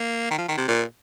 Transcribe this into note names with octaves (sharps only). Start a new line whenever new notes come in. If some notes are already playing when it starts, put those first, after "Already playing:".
Already playing: A#3
D#3
F3
D#3
C3
A#2